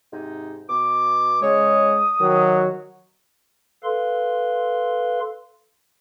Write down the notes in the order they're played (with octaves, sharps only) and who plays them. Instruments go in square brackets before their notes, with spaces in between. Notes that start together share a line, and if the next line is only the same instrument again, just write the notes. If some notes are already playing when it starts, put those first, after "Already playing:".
[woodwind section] G#2 C3 D#4
B2 D6
[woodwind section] C#3 C#5 [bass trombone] G#3 [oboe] D#6
[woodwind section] D#3 [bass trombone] F#3
[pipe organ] A4 B4 F5 C6